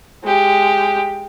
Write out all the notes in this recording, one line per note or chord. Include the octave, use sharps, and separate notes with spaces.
G#3 G4